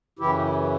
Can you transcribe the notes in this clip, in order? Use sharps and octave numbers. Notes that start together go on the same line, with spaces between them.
F#2 C#3 E3 E4 G4